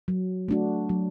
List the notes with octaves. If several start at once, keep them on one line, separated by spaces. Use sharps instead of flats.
F#3
A3 D4 F#4
F#3